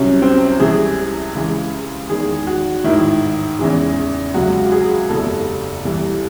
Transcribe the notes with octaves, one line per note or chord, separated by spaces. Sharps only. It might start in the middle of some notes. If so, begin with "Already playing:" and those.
Already playing: C2 C3 F#3 C#4
C4
C2 C3 E3 G#3 G#4
C#2 C#3 E3 G#3
E2 D#3 G#3 G#4
F#4
A1 G#2 D#3 E4
E2 C#3 E3 G#3
C#2 C3 F#3 F#4
F#4
G#4
F#1 E2 C3 A4
C2 C3 E3